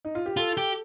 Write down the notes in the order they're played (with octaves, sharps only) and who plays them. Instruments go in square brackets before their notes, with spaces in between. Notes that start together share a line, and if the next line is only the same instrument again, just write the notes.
[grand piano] D#4
F4
G4
[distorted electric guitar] F4 [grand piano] A4
[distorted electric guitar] G4